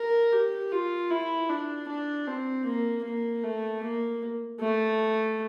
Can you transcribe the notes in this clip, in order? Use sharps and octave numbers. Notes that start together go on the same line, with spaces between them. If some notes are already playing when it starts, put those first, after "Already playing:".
Already playing: A#4
G4
F4
E4
D4
D4
C4
A#3
A#3
A3
A#3
A3